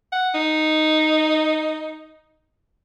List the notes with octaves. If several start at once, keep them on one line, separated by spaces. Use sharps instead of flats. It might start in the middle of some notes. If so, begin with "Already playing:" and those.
F#5
D#4